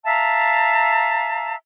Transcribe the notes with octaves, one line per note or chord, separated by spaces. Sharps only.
E5 F5 A5 A#5